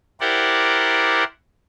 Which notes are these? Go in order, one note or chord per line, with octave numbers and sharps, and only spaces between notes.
E4 G4 A#4 C5 D5 F#5